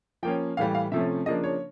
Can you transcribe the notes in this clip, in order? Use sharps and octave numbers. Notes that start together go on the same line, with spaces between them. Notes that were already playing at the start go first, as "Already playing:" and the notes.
F3 A#3 C#4 G5
A2 E3 G3 F5
F5
C3 F3 A3 C#4 E5
C#3 F3 A#3 D4 D#5
C#5